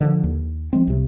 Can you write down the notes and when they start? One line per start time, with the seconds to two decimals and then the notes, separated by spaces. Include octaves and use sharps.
0.01 D3 E3 F3
0.23 D#2
0.73 F3 G#3 C4
0.87 C2 C3